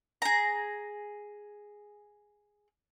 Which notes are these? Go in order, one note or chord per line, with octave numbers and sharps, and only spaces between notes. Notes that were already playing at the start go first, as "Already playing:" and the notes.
G#4 A#5